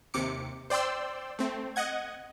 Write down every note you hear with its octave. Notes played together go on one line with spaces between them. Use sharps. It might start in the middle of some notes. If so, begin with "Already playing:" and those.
D#2 C3 D6 C#7
C5 D5 G5 C6 E6
A3 C4
D#5 F#5 G#6